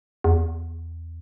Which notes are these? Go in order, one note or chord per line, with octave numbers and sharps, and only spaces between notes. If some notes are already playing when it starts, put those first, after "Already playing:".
E2